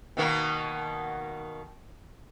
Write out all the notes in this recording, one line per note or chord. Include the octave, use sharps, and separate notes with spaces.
B2 D#3 A#3